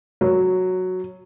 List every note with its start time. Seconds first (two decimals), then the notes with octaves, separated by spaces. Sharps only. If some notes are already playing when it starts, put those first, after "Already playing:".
0.21 F#3